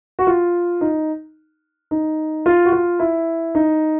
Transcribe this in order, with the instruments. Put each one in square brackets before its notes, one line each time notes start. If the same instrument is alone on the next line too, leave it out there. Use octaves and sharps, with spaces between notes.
[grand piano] F#4
F4
D#4
D#4
F4
F#4
F4
E4
D#4